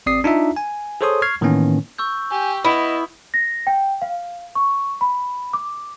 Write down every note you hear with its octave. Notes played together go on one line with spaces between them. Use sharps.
A1 C4 D5 D#6 C7
D4 D#4 F4 E5
G#5
G#4 A4 C5 C#5 C6 D#6
C#6 F6 G#6 C7
A2 D#3 E3 A#3 B3 C#4
C#6 E6 G6
G4 G#5
B3 E4 D#5 D#6
A#6
G5
F5
C#6
B5
D6